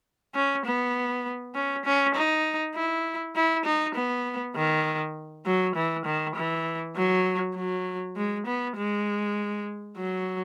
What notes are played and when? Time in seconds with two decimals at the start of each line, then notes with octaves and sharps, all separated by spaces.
0.35 C#4
0.65 B3
1.55 C#4
1.85 C#4
2.15 D#4
2.75 E4
3.35 E4
3.65 D#4
3.95 B3
4.56 D#3
5.46 F#3
5.75 E3
6.06 D#3
6.35 E3
6.96 F#3
7.56 F#3
8.16 G#3
8.46 B3
8.77 G#3
9.97 F#3